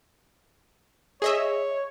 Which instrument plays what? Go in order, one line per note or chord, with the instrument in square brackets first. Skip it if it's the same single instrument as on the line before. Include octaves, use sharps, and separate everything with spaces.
[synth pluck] G#4 D#5 E5 [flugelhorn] C#5